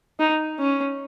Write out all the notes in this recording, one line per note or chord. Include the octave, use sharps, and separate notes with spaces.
D#4
C#4